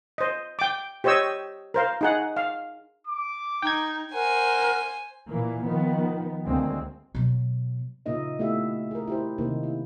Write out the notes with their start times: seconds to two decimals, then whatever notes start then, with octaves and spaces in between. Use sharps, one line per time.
0.18 C5 D#5
0.59 G5 D6
1.04 G4 C5 C#5 D#5 E6
1.74 A#4 C5 F5
2.01 D#4 G#4 F#5
2.37 F5
3.07 D6
3.62 D#4 G5 G#6
4.14 A#4 C5 F#5 G#5
5.29 A#2 E3 A#3
5.66 D#3 F3 B3
6.45 D2 G#3 A#3 C4
7.15 B2 F#3
8.06 A#2 C#3 A#3 D#4 D#5 E5
8.39 A3 B3 E4 G4 E5 F5
8.91 G#4 A#4
9.08 E4 G4 C5
9.38 C3 D#3 A#3 D#4 C5
9.63 E4